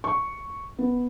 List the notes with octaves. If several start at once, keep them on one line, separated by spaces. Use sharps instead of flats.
C#6
B3